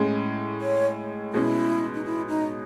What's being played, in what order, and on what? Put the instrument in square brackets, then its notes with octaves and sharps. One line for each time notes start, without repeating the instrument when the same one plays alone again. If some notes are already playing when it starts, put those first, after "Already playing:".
Already playing: [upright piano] A2 G#3 C#4
[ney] C#5
[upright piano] B2 G#3 C#4 [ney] E4
[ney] D#4
E4
D#4